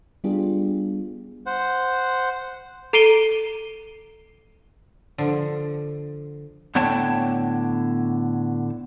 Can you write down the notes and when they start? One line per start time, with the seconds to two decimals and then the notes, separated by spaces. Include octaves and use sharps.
0.24 G3 B3 D4 F4 G4 G#4
1.46 C5 F#5
2.93 A4 A#5 C7 D7 D#7 G7
5.18 D3 F3
6.75 A2 D3 B3 C#5 G5 A5